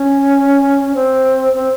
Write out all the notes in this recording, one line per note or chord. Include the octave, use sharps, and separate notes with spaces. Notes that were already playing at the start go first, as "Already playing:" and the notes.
Already playing: C#4
C4
C4